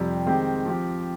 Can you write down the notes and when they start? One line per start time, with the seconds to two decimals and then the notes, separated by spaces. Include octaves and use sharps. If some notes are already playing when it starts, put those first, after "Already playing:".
Already playing: F2 C3 G3
0.26 D#3 G#3 C4 G4
0.66 F3 C4 G4